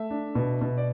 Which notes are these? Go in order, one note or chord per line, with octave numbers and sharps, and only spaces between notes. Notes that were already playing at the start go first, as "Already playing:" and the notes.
Already playing: A3 E5
D4
B2
B2
D5